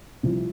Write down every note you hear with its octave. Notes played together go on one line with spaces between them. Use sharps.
C2 C3 F3